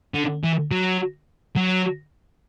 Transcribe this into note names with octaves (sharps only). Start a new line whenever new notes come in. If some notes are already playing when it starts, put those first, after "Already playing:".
D3
E3
F#3
F#3